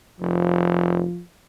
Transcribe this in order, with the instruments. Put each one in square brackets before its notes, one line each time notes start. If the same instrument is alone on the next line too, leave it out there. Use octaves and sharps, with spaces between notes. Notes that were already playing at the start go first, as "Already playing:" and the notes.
[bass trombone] F1 [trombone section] F3